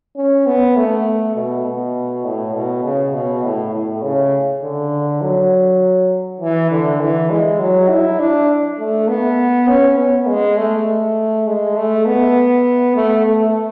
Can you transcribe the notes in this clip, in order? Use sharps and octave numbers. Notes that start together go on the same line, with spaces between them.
C#4
B3
A3
B2
B2
A2
B2
C#3
B2
A2
A2
C#3
D3
F#3
E3
D3
E3
G#3
F#3
E4
D4
A3
B3
C#4
B3
G#3
A3
G#3
A3
B3
A3
A3